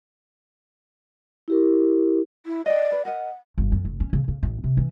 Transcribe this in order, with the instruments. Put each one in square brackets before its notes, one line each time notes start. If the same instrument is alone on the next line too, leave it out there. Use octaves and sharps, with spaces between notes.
[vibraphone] E4 G4 A#4
[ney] E4
[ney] D5 [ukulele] D#5 G5
[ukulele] B4
[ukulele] A#4 D#5 [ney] F#5
[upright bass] G1
F#2
F1
C#4
C#3
C#3
A1
C3
E3